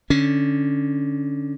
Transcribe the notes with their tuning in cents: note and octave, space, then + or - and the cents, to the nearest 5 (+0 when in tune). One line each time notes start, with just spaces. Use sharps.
D3 +0 C#4 +0